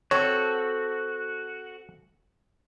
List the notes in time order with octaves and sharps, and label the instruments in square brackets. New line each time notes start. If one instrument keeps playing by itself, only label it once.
[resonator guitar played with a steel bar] C4 A4 [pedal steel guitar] F#4 [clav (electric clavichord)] C#5